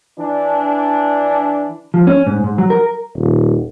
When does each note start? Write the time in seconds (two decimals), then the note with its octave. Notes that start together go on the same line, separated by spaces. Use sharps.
0.19 E3 D4
1.94 F3
2.07 C#4
2.27 G#2
2.44 G#2
2.58 F#3
2.70 A#4
3.16 D#1